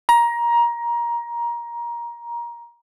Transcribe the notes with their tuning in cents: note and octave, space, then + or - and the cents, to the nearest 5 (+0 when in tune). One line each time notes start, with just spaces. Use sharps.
A#5 +20